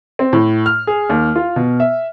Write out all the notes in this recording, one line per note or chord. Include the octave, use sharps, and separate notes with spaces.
C4
A2
F6
G#4
D#2
F4
B2
E5